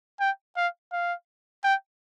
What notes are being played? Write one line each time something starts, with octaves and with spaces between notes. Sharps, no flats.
G5
F5
F5
G5